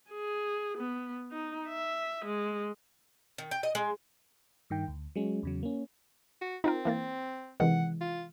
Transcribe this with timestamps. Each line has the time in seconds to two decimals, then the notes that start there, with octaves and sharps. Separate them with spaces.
0.10 G#4
0.78 B3
1.32 D#4
1.68 E5
2.25 G#3
3.38 D#3
3.51 G5
3.63 D#5
3.75 G#3
4.70 G2 D#3 G5
4.88 D2
5.15 F#3 G#3 C#4
5.43 E2 C#3 F#3
5.63 A#3 C#4
6.41 F#4
6.64 C4 D#4 F4 A#4
6.85 E3 A#3 A6
7.60 C3 D#3 E3 G#3 F#5
8.01 F4